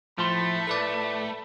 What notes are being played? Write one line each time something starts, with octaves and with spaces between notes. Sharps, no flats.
A2 F3 A3 B5 C6
A4 B4 D5